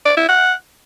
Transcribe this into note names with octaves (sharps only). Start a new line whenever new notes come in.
D5
E4
F#5